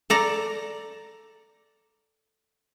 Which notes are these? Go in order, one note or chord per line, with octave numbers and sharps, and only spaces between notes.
A4 D5 A#5